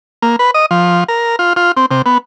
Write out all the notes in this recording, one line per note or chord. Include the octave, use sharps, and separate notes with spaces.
A#3
B4
D#5
F3
A#4
F4
F4
C4
C3
B3